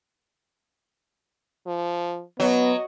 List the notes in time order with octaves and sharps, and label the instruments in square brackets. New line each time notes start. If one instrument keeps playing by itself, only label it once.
[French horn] F3
[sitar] F#3 [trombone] B3 [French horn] D#5